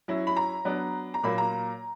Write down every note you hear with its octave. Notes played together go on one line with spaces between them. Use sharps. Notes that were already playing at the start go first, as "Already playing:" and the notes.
F#3 C#4 E4
B5
A#5
F#3 B3 D4
A#5
A#2 F#3 A#3 B5
A#5